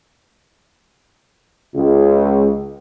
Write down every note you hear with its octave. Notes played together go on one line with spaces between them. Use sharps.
C#2